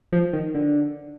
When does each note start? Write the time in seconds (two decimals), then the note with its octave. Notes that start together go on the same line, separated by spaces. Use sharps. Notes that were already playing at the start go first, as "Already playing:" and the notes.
0.12 F3
0.33 D#3
0.54 D3